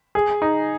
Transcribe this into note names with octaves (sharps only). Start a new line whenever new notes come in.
G#4
D#4